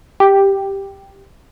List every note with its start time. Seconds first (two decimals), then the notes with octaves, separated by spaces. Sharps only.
0.20 G4